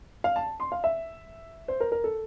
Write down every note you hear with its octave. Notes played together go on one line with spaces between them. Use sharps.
F5
A5
C6
F5
E5
C5
A#4
A#4
A4